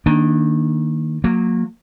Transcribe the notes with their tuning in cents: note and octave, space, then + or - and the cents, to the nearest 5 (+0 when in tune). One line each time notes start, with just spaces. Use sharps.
D#3 +0 A#3 +0 D4 +0
F#3 -30 A#3 -15